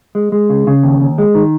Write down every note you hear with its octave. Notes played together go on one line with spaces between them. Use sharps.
G#3
G#3
C#3
C#3
D#2
D#2
G#3
D#3